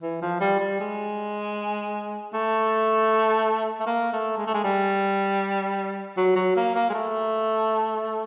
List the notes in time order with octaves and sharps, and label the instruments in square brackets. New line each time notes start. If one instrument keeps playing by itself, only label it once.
[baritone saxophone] E3
F3
G3
G3
G#3
A3
A3
A#3
A3
G#3
A3
G#3
G3
F#3
F#3
A#3
A#3
G#3
A3